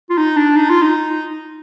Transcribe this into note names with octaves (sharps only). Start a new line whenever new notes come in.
F4
D#4
D4
D#4
F4
D#4